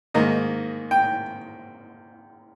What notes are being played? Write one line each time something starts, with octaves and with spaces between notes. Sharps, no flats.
G#2 D#3 A#3 D#5
G5